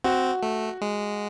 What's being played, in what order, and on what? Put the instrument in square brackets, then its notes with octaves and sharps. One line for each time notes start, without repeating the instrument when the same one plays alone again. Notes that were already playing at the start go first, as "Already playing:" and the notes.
[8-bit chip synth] C4 [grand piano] F#4
[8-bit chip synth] A3
G#3